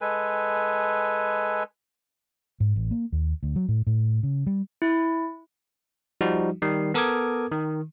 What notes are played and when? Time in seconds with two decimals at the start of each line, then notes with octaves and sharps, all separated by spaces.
0.01 G#3 A4 B4 G#5
2.60 G#2
2.76 A1
2.91 A#3
3.12 D#2
3.43 D2
3.56 F#3
3.68 A2
3.87 A2
4.23 C#3
4.47 G3
4.82 E4
6.21 F3 G3 D#4 F#4
6.62 D#3 G3 C7
6.94 B3 A4 A#4 D6 D#6 G#6
7.52 D#3